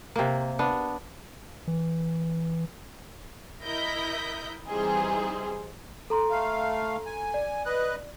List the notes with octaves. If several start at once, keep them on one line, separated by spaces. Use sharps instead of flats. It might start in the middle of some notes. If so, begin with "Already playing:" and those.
C3 A#3
B3 D4
E3
E4 A#4 D#5 G6 A#6 B6
E3 G3 C4 D#4 G#4 C5
A4 A#5 C6
A3 F5
G#5
D5
B4 D#5 F#6